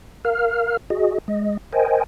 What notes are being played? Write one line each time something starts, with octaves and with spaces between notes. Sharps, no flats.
A#4 F5 F6
F#4 G#4 D#5
G#3 D#5
A#4 C5 D#5 G5 G#5